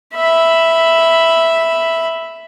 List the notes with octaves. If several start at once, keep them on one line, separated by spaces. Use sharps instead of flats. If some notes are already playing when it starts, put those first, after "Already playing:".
E5 B5